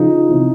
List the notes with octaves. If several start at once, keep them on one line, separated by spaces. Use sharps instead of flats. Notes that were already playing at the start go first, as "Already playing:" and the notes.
Already playing: C#3 F3 D#4
C3 E3